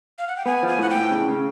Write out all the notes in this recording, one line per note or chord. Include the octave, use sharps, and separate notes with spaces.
F5
F#5
G5
B3 G#5
F3 G#5
A2 F#5
G5
A2
C#3
C#3